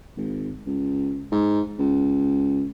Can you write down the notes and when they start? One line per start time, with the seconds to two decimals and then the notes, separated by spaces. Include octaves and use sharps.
0.17 G#1
0.66 C#2
1.32 G#2
1.79 C#2